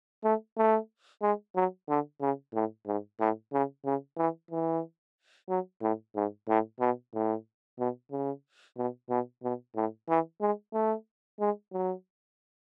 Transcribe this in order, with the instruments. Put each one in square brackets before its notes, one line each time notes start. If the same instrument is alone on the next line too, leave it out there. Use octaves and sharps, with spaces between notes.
[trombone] A3
A3
G#3
F#3
D3
C#3
A2
G#2
A2
C#3
C#3
E3
E3
F#3
A2
G#2
A2
B2
A2
B2
C#3
B2
B2
B2
A2
E3
G#3
A3
G#3
F#3